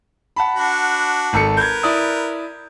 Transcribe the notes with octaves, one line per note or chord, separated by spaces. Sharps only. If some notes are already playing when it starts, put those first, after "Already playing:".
F#5 A5 B5
D4 F#4
G#1 A4 C#7
A#4 B4 G6 G#6
E4 D5 D#6